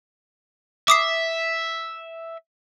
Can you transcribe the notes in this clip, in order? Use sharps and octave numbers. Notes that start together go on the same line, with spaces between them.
E5 D6 D#6 C7